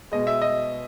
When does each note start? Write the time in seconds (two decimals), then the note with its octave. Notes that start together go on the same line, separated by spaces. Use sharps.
0.12 B2 G#3 D#5
0.27 E5
0.42 D#5